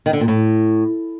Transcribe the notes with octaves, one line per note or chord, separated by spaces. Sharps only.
D#3
D3
A#2
A2